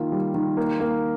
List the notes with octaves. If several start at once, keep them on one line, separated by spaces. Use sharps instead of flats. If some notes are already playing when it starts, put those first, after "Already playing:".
Already playing: D#3 A#3 F4
G3
D#3
A#3
A#3